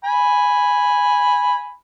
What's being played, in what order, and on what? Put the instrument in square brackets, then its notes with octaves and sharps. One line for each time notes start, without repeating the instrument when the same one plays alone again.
[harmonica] G#5 B5